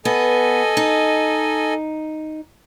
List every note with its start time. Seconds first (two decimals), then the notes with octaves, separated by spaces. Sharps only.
0.05 B3 A4 D#5 G#5
0.77 D#4